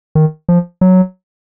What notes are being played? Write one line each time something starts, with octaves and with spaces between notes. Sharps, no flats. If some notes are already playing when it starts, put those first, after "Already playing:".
D#3
F3
F#3